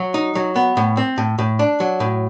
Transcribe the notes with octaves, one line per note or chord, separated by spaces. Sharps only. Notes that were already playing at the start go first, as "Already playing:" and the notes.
Already playing: F#3
D#4
F#3
B3
A2
C4
A2
A2
D4
F#3
A2